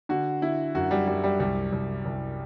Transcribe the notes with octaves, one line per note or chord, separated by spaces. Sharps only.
D3 F#4
D3 E4
F#2 F#4
G3
F#2 G3
G3
C2 G3
C2
C2